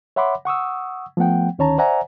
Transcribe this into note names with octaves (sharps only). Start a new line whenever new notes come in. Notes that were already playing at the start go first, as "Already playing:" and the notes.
C#5 E5 F#5 B5 C6 D6
F#5 C#6 D#6 E6
F3 A3 B3 F#5 G5
D2 D#3 C#4 C#5 A5 A#5
C5 D5 E5 F#5 G#5 A#5